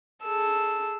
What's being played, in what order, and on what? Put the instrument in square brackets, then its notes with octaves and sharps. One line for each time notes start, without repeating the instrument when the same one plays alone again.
[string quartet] G#4 A4 E6